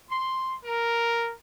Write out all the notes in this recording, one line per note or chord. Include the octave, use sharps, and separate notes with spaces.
C6
A#4